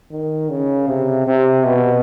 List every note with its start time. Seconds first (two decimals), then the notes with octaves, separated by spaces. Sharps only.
0.11 D#3
0.50 C#3
0.88 C3
1.27 C3
1.65 B2